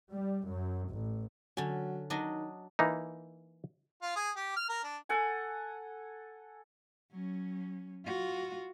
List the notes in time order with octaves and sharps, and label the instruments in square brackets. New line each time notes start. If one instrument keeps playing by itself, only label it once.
[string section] G3
F#2
A1
[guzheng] D3 C#4 [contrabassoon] F#3
[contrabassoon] D#3 [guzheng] F#3 D4 D#5
[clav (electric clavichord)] E3 A#3 D#4
[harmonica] F4
G#4
G4
F6
A#4
D4
[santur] A4 F#5 G#5
[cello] F#3 C#4
F4 F#4